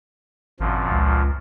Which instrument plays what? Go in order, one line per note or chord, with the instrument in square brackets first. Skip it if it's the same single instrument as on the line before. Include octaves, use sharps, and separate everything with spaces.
[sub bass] G#1 [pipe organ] F#2 A#2 F3
[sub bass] C#2